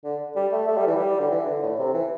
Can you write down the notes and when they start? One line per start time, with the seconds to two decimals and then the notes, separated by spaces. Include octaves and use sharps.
0.04 D3
0.36 G3
0.52 A3
0.67 A3
0.77 G3
0.87 E3
0.96 G3
1.19 D3
1.31 E3
1.46 D3
1.62 A2
1.79 C3
1.94 E3